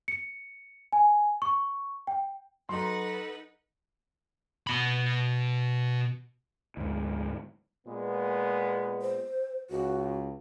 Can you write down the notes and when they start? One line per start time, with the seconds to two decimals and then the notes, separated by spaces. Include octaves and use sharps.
0.08 C#7
0.92 G#5
1.42 C#6
2.07 G5
2.69 F#3 D#4 A4 B4 F#5 A#5 C6
4.67 B2 B5
6.77 D2 G#2
7.86 A#2 G#3 B3
9.02 C5
9.70 C#2 F#4